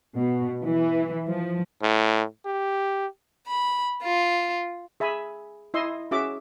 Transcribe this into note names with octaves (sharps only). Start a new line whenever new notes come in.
B2
E3
F3
A2
G4
B5
F4
G#4 E5 G#5 B5
E4 D#5 C6 E6
C#4 F#4 G#4 E5 D6